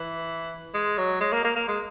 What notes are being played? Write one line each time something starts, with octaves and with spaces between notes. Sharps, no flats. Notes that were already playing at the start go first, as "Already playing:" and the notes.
Already playing: E3
G#3
F#3
G#3
A#3
A#3
A#3
G#3